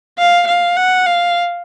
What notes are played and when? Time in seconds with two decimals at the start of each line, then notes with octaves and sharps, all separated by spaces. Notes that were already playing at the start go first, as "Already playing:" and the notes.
0.19 F5
0.48 F5
0.76 F#5
1.06 F5